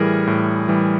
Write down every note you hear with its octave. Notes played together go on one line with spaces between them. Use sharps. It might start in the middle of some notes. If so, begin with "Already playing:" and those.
Already playing: A2 E3 G3 G#4 A#4
A2
E3 G3